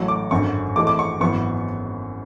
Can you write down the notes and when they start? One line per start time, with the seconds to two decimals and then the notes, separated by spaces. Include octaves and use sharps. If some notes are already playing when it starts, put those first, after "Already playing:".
Already playing: A1 A2 F#3 A3 C#6
0.08 D6
0.31 G#1 F#2 D3 C#6
0.76 G#1 G#2 E3 A3 D6
0.87 D6
0.99 C#6
1.20 G#1 F#2 E3 B3 C#6